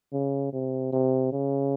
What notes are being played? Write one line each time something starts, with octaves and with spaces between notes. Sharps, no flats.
C#3
C3
C3
C#3